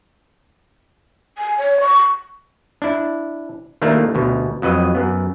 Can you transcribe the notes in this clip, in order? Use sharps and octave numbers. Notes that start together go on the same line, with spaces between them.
G#5
C#5
C#6
D4 E4
D#3 A3 A#3 D4 E4
D2 B2
F2 F#3 B4 D#5
F#2 B3